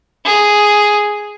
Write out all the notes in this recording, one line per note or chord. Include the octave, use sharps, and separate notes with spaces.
G#4